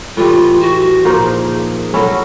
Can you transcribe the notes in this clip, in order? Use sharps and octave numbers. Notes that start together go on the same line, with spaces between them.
A2 E3 G3 F4
F#4
A#2 F3 A#3 D#4 G#4
F#3 A3 C#4 E4 A4